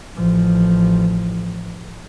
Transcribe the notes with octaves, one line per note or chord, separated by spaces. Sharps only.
A1 F3